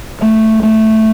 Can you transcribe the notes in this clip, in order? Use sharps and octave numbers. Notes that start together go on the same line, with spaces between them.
A3
A3